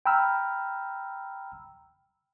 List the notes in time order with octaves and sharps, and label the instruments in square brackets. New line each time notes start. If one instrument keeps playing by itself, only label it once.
[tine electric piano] G5 A#5 B5 E6 F6